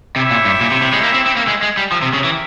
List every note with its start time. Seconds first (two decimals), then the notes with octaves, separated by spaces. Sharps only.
0.16 C3 E4 G4 C#5 E5 G5
0.31 A#2
0.45 G2
0.61 A#2
0.71 C3
0.82 C3
0.93 G#3
1.03 A#3
1.14 C4
1.26 C4
1.37 A#3
1.48 G#3
1.63 G#3
1.77 G3
1.91 F3 C4 G4 A#4 E5
2.02 C3
2.14 C#3
2.24 E3